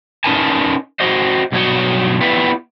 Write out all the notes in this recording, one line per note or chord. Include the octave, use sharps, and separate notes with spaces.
C#4 D#4 A#4 B4 G#5 A5
F#4 C5 D#5
G2 B2 F#3 C#4 C#5 D#5
B3 E4 F4 G4 B4